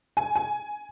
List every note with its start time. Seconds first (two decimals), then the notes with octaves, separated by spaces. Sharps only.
0.17 G#5
0.35 G#5